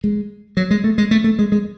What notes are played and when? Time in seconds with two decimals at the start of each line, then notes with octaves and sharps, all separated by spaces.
0.04 G#3
0.57 F#3
0.71 G#3
0.84 A3
0.98 G#3
1.11 A3
1.24 A3
1.39 G#3
1.52 G#3